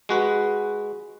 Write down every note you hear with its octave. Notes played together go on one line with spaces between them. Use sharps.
G#3 F#4 B4